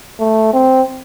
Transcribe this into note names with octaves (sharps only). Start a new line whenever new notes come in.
A3
C4